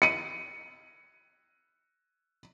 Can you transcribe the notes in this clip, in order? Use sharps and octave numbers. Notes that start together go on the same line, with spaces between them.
C#7 D#7